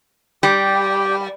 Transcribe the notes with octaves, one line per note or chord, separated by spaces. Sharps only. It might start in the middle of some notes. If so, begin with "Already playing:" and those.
G3 G4 G5